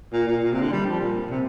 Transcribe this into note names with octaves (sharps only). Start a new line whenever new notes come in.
A#2
A#2
A#2
C3
D3
G3
F3
A#2
C3